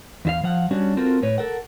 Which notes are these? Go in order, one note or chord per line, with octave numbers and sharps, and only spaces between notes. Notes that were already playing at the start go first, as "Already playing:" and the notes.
E2 E4 F5
F3 F5 F#5
G3 C#4 D4 F#4
C4 F4 F#4 A4 A#4
A2 B4 C#5
A4 A#4 F#5